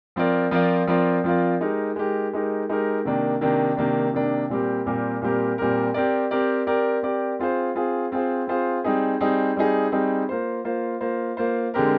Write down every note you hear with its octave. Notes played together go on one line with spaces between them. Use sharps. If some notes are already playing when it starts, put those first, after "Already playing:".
F3 C4 F4 A#4 D5
F3 C4 F4 A#4 D5
F3 C4 F4 A#4 D5
F3 C4 F4 A#4 D5
G#3 D#4 G4 A#4
G#3 D#4 G4 A#4
G#3 D#4 G4 A#4
G#3 D#4 G4 A#4
C3 D#3 A#3 D4
C3 D#3 A#3 D4
C3 D#3 A#3 D4
C3 D#3 A#3 D4
A#2 G3 C4 G4 A#4
A#2 G3 C4 G4 A#4
A#2 G3 C4 G4 A#4
A#2 G3 C4 G4 A#4
C4 G4 A#4 D5
C4 G4 A#4 D5
C4 G4 A#4 D5
C4 G4 A#4 D5
C4 F4 G#4 C5
C4 F4 G#4 C5
C4 F4 G#4 C5
C4 F4 G#4 C5
G3 C4 D#4 G#4
G3 C4 D#4 G#4
G3 C4 D#4 G#4
G3 C4 D#4 G#4
A#3 F4 C5
A#3 F4 C5
A#3 F4 C5
A#3 F4 C5
D3 G#3 C4 G4 A#4